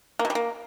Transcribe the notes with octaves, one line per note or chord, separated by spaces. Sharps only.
A#3
B2
G3
A#3